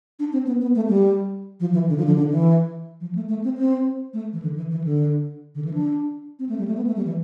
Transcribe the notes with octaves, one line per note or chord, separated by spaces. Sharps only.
D4
C4
B3
B3
A3
G3
F3
E3
D3
F3
D3
D3
E3
F3
A3
A3
C4
C4
A3
E3
D3
E3
E3
D3
D3
E3
D4
C4
A3
G3
A3
B3
A3
G3
E3